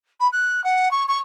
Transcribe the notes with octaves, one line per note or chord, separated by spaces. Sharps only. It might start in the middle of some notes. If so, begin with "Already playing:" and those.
B5
F#6
F#5
C#6
C#6